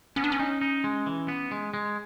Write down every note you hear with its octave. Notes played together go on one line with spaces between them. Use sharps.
B3 C#4
D4
C#4
D#4
D#4
G#3
E3
B3
G#3
G#3